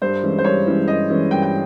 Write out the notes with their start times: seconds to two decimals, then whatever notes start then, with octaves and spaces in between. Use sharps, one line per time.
0.02 G2 C5
0.23 E3 G#3 C#4 E4
0.38 C5
0.44 G2 C#5
0.66 E3 G#3 C#4 E4
0.88 G2 D#5
1.10 E3 G#3 C#4 E4
1.31 G2 G5
1.43 G5